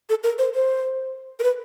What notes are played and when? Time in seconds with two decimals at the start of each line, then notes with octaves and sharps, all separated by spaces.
0.09 A4
0.23 A#4
0.38 C5
0.54 C5
1.39 A#4
1.43 B4